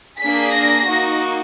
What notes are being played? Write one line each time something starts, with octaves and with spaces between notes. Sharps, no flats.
A#3 D4 G#4 B6
A#6
A#3 D#4 F#4